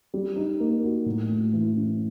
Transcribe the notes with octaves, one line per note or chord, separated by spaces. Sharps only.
G3
D#4
A#3
F#4
A2
A3
E3
C#4